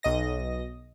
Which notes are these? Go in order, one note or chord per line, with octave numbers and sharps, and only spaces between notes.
B1 D#5 A#6